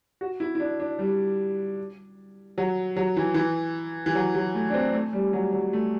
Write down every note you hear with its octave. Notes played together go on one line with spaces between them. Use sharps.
F#4
E4
E4
D4
D4
G3
F#3
F#3
E3
E3
E3
F#3
F#3
A3
D4
C4
A3
G3
F#3
F#3
A3